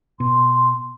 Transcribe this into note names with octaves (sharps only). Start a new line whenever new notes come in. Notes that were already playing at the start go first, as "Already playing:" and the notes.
B2 C6